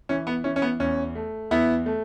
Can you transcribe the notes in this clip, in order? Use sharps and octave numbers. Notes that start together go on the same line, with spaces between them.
E3 C#4
B3
E3 C#4
C#4
B3
E2 C#4
A3
E2 B3 E4
A3